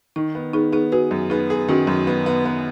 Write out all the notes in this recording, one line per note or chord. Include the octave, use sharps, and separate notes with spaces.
D#3 D#4
B3
B3 D#4 G#4
B3 D#4 G#4
F#4 G#4 B4
F#2
B3 D#4 G#4
G#4
D#3 C#4 F#4
F#2
B3
B3
B3